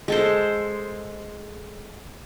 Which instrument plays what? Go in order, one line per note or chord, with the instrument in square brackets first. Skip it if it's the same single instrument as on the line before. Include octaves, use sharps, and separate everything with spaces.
[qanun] G#3 A4 C5